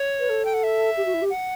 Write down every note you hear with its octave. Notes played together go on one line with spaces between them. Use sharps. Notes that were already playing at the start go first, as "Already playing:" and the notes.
Already playing: C#5
B4
A4
G5
F#5
E5
G4
F#4
E4
G4
F#5